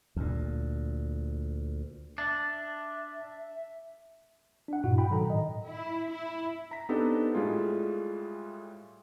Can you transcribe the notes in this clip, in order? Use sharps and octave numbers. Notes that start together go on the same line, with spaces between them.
D2 A#2
D4 E5 A6
D4 F#5
G2 A#2 E4 F#4
F#5 G5 B5
G#2 B2 D#3 F#3 A4 A#5
A2 D#5
E4
E4
A#5 B6
B3 C4 D4 D#4 G4 A4
A2 G3 G#3 F4 G#4